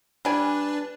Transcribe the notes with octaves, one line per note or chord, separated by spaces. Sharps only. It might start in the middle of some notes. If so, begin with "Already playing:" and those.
G3 D4 B4 D5 G#5